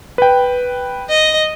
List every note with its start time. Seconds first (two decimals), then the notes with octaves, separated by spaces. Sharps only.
0.18 B4 G5
1.09 D#5